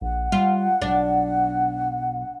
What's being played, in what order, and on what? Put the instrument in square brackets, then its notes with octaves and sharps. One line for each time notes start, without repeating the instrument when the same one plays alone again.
[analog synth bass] A#1 [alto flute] F#5
[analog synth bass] G3 [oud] F4
[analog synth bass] B1 [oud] D4